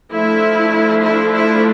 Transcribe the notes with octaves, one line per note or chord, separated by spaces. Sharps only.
F3 A3 D4 E4
E4
E4